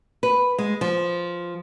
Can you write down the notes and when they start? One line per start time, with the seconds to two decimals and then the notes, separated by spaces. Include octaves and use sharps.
0.23 B4
0.58 G#3
0.81 F3